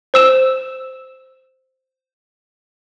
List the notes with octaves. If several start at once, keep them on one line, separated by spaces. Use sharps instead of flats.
C5 E6 E7